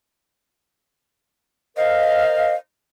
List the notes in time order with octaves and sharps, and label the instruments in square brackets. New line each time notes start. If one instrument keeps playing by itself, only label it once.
[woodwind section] A#4 C5 F5 [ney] D#5